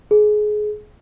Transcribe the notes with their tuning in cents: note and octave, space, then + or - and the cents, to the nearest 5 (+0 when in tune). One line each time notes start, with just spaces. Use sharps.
G#4 +25